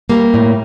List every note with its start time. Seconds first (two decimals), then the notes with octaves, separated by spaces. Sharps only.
0.09 G3 A#3
0.34 A2